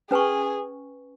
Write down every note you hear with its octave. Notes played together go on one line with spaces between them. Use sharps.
C#4 G#4 B4 G#5 C#6